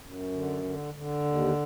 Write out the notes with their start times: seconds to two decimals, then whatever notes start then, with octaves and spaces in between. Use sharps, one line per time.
0.01 F#2
0.32 D3
0.63 D3
0.94 D3
1.25 D#2